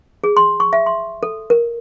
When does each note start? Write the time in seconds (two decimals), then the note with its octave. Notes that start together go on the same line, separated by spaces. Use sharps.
0.24 G#4
0.37 C6
0.60 C#6
0.73 E5
0.86 C6
1.23 A4
1.50 A#4